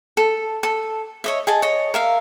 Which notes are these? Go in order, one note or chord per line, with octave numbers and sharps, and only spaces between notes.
A4
A4
C#5 D#5 E5
G#4 D#5 A5
C#5 D#5
A#4 E5 F5